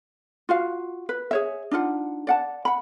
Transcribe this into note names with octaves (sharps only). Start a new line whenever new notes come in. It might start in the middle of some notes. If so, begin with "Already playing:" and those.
F4 F#4 F5
B4
G#4 C#5 E5
D4 D#4 F4 F#5
D5 F#5 A5
F#5 B5